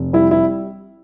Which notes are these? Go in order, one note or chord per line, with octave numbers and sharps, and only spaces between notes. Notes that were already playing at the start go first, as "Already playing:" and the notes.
Already playing: F1
G3 E4
E4